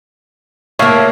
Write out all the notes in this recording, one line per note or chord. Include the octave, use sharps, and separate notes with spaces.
A2 A#3 C#5 E5 F5